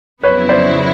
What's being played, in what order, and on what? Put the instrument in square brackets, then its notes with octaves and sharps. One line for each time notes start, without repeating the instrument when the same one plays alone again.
[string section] F2 C#3 F#3 B3 E4 [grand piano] B4 C#5
[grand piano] C5 D5